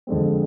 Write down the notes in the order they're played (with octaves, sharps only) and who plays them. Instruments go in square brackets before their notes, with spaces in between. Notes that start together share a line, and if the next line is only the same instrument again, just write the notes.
[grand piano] F2 D3 G#3 C4